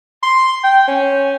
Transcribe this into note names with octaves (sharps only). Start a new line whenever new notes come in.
C6
G5
C#4